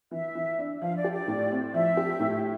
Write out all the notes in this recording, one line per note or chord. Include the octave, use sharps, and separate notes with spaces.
E3 E5
E3
D4
F3 F5
D5
G4
D5
A2
C4
F3 E5
G4
A2